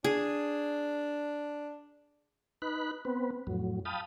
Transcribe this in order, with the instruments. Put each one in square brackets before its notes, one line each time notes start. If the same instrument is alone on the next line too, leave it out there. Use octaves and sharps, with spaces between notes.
[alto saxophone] D4 [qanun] G#4
[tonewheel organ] D#4 B4 B5 F#6
B3 C4 B4
F2 A2 F#3
F5 G5 A5 B5 D#6